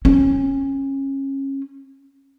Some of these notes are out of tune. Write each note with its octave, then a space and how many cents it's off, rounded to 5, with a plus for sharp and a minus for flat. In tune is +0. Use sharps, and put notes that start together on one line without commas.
C#4 -25